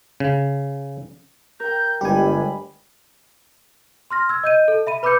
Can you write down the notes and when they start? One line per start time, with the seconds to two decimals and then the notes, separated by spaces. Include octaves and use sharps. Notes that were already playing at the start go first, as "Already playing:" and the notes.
0.20 C#3
1.60 A#4 G5 G6
2.01 G1 G3 G#3 G4 G#5 B5
4.11 C6 F6 A#6
4.29 E6 G#6
4.44 D#5 G6 D#7
4.68 A4
4.87 E5 B5 D#7
5.03 B4 B5 D6 E6 G6 C#7